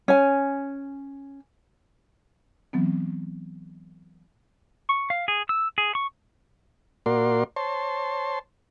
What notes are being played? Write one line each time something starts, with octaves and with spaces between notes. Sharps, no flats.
C#4 G#5
E3 F#3 B3 C4
C#6
F5
G#4
E6
G#4
C#6
A#2 A#3 F#4 A#4 D5 C6
C5 C#5 A5 C6